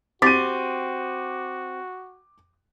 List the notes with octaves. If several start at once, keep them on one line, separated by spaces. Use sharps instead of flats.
C4 F#4 G4 D6 A6 B6 D#7